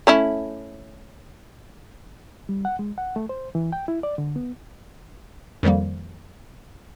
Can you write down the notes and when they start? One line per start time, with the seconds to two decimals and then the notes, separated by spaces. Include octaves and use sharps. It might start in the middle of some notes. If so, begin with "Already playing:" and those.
0.07 A3 C#4 E4
2.49 G3
2.65 F#5
2.79 G#3
2.98 F#5
3.16 A3
3.29 C5
3.55 E3
3.72 G5
3.88 E4
4.03 D5
4.18 D3
4.36 B3
5.63 F2 D#3 F3 G3 A#3